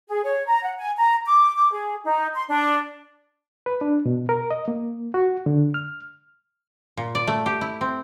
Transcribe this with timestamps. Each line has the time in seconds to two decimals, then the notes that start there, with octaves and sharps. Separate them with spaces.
0.08 G#4
0.24 C#5
0.47 A#5
0.63 F#5
0.79 G#5
0.97 A#5
1.26 D6
1.55 D6
1.72 G#4
2.04 D#4
2.34 C6
2.48 D4
3.66 B4
3.81 D4
4.06 B2
4.29 A#4
4.51 D#5
4.68 A#3
5.14 F#4
5.46 D3
5.74 F6
6.97 A#2
7.15 D5
7.27 A3
7.46 G4
7.61 E4
7.81 C4